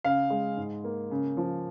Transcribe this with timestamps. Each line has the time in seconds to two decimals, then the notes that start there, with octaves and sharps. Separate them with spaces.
0.04 C#3 F5
0.30 G#3
0.57 G#2
0.84 A#3
1.11 C#3
1.37 F3